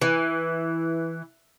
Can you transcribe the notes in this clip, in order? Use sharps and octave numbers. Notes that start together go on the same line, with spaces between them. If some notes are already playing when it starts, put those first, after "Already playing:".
E3